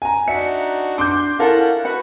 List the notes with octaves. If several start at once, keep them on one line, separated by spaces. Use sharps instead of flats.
G#5 A#5
D4 D#4 F#4 E5 C#7
D4 C6 D6 G6
C#4 E4 F4 A4 A#4 F5 F#5
F#4 B4 F#5